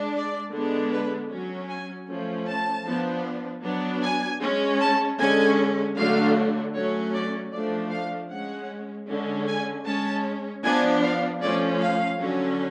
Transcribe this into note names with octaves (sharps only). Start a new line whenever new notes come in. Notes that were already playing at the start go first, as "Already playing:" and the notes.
Already playing: G#3 D4
D5
D3 G#3 B3 D4
B4
F#3 C#4
G#5
F3 A3 C#4
A5
F3 B3 D4
F#3 B3 D4
G#5
G#3 C#4
A5
D3 G#3 C#4 G#5
D3 F#3 A3 D4 F5
F#3 A3 C#4 C#5
D5
F3 A3 D4 D5
F5
G#3 C#4 F#5
D3 G#3 C#4
G#5
G#3 C#4 A5
F3 B3 D4 G#5
F5
F3 A3 C#4 D5
F5
D3 F#3 C#4